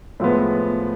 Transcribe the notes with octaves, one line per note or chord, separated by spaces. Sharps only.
A2 F3 G#3 B3